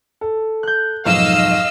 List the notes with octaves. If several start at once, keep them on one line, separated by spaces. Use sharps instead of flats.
A4
F#6 G6
B1 F2 G#2 D#5 F5 E6